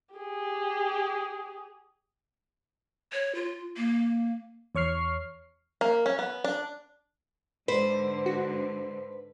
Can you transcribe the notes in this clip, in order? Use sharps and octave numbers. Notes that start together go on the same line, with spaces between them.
G4 G#4
C#5
F4
A#3
E2 C#5 C#6 F6 C7
A#3
C#4
B3
D4
G#2 D3 B4 C5
F#4